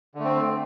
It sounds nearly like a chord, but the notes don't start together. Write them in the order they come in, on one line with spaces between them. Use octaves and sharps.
D3 A3 C4